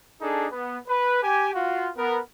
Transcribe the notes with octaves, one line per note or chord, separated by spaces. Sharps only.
D4 D#4 G#4 A4
B3
B4
G4 G#5
F4 F#4
B3 A#4